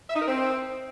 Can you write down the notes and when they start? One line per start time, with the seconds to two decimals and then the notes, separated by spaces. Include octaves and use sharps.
0.10 E5
0.16 D#4
0.22 A#4
0.28 C4